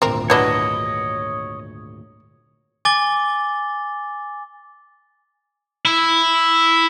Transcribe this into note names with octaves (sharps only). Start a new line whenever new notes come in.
G#1 D2 A#2 C4 A#4
F#3 D4 E4 B4 C#5 D#5
G#5 D6 A6 G7
E4